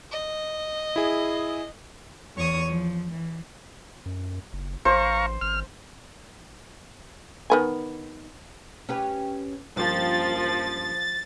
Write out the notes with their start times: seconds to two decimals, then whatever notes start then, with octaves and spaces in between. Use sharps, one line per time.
0.11 D#5
0.96 E4 G#4
2.36 E2 C#5 C#6 D#6
2.70 F3
3.12 E3
4.06 F#2
4.53 F#1
4.85 A1 C5 F5 A#5 C#6
5.41 G#1 F6
7.50 D#3 B3 G#5
8.89 C#4 G4 B4
9.77 G2 F3 A#3 C#4 A6